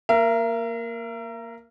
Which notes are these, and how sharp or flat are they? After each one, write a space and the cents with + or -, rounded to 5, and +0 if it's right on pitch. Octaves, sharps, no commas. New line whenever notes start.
A#3 +0 A#4 +0 E5 +45